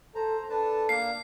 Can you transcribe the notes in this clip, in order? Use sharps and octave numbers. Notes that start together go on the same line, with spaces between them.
A4 C5 A#5
D4 A4 B4 A5
A#3 D4 F5 C7